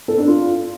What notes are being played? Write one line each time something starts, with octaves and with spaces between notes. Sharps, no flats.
A4
D4
F4